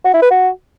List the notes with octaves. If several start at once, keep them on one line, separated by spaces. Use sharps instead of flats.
F#4
E4
B4
F#4